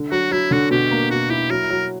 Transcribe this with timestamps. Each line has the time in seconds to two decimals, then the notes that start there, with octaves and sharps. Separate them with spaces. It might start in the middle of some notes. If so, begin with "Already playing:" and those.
Already playing: D3
0.11 F#3 F#4
0.31 F#3 E4
0.51 D3 F#4
0.71 B2 G4
0.91 A#3
1.10 B2 F#4
1.30 E4 G4
1.50 F#3 A#4
1.70 F#3